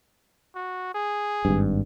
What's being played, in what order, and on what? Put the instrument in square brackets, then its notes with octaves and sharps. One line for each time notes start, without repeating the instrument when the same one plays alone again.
[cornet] F#4
G#4
[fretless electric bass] G#1 G2